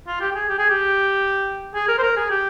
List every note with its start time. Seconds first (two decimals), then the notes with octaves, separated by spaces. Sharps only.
0.07 F4
0.21 G4
0.31 G4
0.35 G#4
0.50 G4
0.59 G#4
0.70 G4
1.75 G#4
1.88 A#4
1.98 C5
2.03 A#4
2.17 G#4
2.30 G4